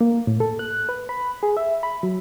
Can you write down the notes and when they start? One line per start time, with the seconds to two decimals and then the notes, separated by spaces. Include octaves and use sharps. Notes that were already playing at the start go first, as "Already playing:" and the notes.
0.01 A#3
0.27 A2
0.40 A4
0.59 F#6
0.89 B4
1.09 B5
1.43 G#4
1.57 E5
1.83 B5
2.03 F#3